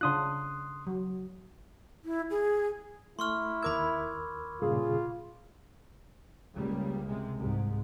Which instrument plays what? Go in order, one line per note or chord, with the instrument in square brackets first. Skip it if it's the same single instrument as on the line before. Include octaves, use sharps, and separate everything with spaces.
[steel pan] C#3 D4 F4 [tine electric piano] C6 D#6 F#6
[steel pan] F#3
[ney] E4
G#4
[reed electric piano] A3 [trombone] E4 [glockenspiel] C6 C#6 F6
[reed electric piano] D#2 A#4 E6 [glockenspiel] B5 D6 G#6
[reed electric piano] G2 A#2 C#3 [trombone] F4 [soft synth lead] G#4
[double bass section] C#2 C#3 G3 A#3
C3 G#3
C2 G#2